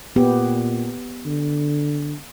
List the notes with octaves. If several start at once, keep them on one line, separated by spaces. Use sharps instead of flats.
A#2 B3 G4
D3